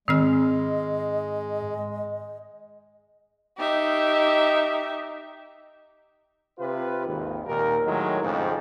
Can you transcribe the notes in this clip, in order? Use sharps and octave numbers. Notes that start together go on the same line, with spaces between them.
G#2 D#3 G#3 C4 D#5 F6
D#4 G4 E5
C3 F4 B4
G#1 D#2
D#2 A#2 A#4
A2 D#3 F#3 G#3
F2 G#2 C#3 F3